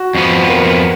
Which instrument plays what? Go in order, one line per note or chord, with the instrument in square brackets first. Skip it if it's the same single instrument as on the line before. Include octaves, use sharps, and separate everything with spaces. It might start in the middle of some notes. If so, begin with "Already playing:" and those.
Already playing: [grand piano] F#4
[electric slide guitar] F2 F3 B3
[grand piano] A#4